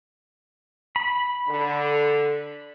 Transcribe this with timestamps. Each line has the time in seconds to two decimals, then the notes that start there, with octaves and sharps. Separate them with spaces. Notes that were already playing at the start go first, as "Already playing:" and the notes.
0.96 B5
1.48 D3